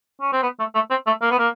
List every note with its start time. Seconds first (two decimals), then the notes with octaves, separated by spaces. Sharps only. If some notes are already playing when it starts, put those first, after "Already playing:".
0.21 C#4
0.32 C4
0.43 B3
0.59 A3
0.75 A3
0.90 C4
1.07 A3
1.22 A#3
1.31 B3
1.39 A#3